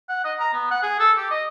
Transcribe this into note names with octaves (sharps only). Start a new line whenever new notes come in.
F#5
D#5
A#5
B3
F#5
G#4
A4
G4
D#5